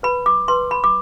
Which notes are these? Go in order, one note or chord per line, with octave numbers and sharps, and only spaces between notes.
B4 B5
D6
B4 C6
B5
D6